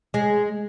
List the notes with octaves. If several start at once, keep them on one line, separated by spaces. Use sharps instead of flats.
G#3